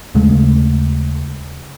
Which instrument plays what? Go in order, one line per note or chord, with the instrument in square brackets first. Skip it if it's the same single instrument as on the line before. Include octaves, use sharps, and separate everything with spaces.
[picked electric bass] D#2 C#3 G#3 A3